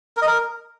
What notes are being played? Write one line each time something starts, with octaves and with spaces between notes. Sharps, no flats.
A#4
D#5
A#4